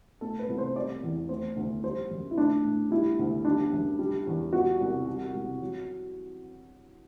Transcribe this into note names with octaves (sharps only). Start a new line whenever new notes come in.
A3 A4
B4
C2
C5
G3 D5
E2
A3 C5
D2
G3 C5
F#2
E4
A3 D4
A2
G3 E4
D2
G3 D4
F#2
G3
E2
G3 F#4
C2
G3
C2
F#3